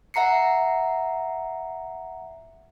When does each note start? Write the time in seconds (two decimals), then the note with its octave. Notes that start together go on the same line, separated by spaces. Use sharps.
0.14 E5 F#5 A#5 C7 C#7